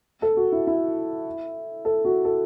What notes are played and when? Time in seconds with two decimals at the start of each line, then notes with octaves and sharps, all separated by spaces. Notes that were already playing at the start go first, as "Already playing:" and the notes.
0.22 A4
0.37 F#4
0.52 E4
0.67 E4
1.85 A4
2.05 F#4
2.25 A4